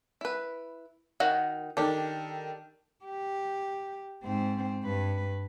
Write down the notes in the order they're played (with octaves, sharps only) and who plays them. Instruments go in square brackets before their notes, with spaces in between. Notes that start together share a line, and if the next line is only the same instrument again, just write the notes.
[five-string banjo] E4 B4
D#3 F#4 F#5
[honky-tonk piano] D#3 A4 [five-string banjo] D4 G4
[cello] G4
G#2 C4
G2 B4